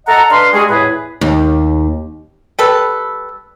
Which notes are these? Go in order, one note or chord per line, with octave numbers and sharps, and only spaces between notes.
A4 D#5 F#5 A5 A#5
D4 B4 F5 C6
G3 G#3 F#4 G#4
E2 A2 G#4 B4
D#2
G3 A4 B4